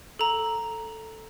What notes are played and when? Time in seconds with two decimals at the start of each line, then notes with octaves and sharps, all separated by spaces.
0.19 A4 A#5